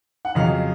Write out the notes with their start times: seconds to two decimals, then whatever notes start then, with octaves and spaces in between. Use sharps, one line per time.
0.25 F#5
0.35 F2 C#3 F#3 D#5 F5